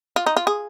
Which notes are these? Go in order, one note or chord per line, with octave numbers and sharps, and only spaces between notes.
F4
D#4
F4
G#4